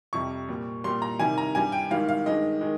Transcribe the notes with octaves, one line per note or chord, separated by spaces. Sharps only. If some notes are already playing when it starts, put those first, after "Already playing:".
F2 C3 G3 C#6
A#2 G3
A#2 G3 C6
A#5
C3 D#3 G3 G#5
A#5
G2 G3 G#5
G5
G#2 D#3 G3 F5
F5
G2 D#3 G#3 D#5
D#3 G#3